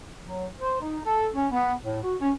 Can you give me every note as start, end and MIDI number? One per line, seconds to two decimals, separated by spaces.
0.24 0.47 54
0.61 0.79 72
0.80 0.98 63
1.05 1.28 69
1.35 1.47 61
1.52 1.74 59
1.83 2.02 45
2.03 2.15 66
2.21 2.31 61